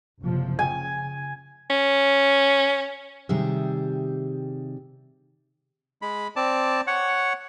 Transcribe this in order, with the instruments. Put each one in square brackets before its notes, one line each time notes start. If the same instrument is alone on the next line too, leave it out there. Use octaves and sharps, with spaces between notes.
[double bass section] F#1 C3 F3
[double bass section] C#3 [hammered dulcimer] G#5
[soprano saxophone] C#4
[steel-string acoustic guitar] C3 D#3 G3 G4 G#4 E5
[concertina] G#3 B5
C4 D5 A5
C#5 F#5